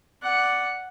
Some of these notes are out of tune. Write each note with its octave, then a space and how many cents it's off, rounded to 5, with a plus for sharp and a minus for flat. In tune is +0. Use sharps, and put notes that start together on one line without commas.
D5 +0 F#5 +0